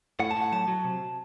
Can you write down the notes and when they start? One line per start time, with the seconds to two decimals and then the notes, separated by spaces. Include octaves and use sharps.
0.20 A2 F#5
0.31 A5
0.36 A2
0.41 F#5
0.52 F#3 A5
0.68 F#3
0.85 C3